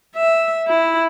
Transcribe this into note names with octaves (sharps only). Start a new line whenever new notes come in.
E5
E4